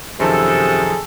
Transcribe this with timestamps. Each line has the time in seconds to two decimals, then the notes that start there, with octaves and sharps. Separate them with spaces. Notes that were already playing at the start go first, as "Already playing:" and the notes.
0.20 F#2 C3 D#3 F3 G#4 A4